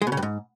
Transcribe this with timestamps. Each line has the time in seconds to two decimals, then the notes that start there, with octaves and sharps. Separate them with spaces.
0.02 G#3
0.07 B2
0.12 C#3
0.17 G2
0.22 G#2